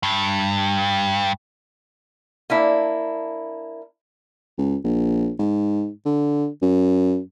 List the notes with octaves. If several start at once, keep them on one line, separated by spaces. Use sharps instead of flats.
G2
A#3 D4 E4
C#2
A#1
G#2
D3
F#2